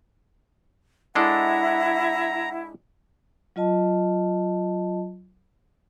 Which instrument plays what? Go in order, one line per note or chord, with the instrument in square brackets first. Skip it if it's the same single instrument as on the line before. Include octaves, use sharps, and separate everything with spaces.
[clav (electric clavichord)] G#3 D4 A4 [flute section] E4 [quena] F#5 [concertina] A#5
[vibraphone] F#3 F4 D#5 A5